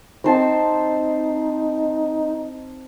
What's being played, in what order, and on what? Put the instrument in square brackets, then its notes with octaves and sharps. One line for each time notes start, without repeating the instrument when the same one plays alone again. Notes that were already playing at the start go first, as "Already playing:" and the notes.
[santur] C4 C5 A5 [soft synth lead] D#4